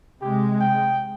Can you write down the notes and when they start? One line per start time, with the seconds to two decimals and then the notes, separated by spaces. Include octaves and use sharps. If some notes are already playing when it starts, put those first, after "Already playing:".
0.21 C3 G#3 G4
0.61 G5